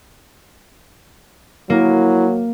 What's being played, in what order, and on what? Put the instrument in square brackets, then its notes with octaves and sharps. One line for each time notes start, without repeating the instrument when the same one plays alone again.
[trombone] F#3 [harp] A#3 [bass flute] E4